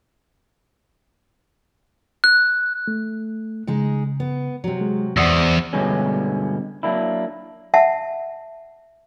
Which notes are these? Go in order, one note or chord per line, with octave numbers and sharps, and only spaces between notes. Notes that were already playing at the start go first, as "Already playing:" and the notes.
F#6
A3
C#3 G#3 D#4 G#4
B3
C3 F#3
G#3
E2 C4 C5 D5 F#5 D#6 E6
D2 G2 B2 D3 G#3 C#4
F#3 A#3 D4 E4
E5 F#5 A5